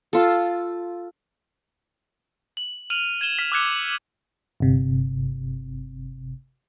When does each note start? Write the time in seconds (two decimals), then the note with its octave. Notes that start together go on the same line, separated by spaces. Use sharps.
0.13 F4 A4
2.57 F#7
2.90 F6 D#7 F7 F#7
3.21 G#6 E7 G7
3.39 F6 B6
3.52 D6 E6 F#6 G#6 C#7 G7
4.60 G1 C3